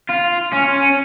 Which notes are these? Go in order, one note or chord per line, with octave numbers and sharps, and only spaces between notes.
F4
C#4